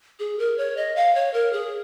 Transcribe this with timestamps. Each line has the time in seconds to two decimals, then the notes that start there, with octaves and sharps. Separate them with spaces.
0.20 G#4
0.39 A#4
0.58 C#5
0.77 D#5
0.96 F5
1.15 C#5
1.34 A#4
1.53 G#4